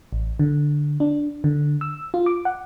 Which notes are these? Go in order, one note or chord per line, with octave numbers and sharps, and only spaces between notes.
A1
D3
D4
D3
E6
F4
D6
F#5